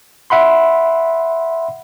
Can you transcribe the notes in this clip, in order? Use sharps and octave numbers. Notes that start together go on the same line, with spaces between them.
E5 F#5 B5 C6